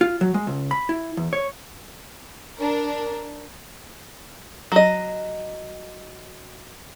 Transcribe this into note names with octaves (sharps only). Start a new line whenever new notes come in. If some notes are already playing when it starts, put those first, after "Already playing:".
F4
F#3
G#3
C#2
B5
E4
E2
C#5
D4 A#4
F#3 D#5